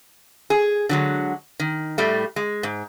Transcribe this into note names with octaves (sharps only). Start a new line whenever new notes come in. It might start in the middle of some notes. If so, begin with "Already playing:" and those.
G#4
D3 F#3 G#3
D#3
A2 G3 A3
G#3
G#2